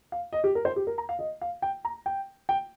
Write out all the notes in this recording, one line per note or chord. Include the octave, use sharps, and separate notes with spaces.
F5
D#5
G4
A#4
C5
G4
A#4
A#5
F5
D#5
F5
G5
A#5
G5
G5